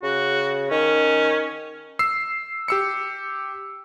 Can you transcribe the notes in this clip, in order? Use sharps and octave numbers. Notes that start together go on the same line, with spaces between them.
C#3 F#4
D#3 C#4
E6 C7
G4 E6 C#7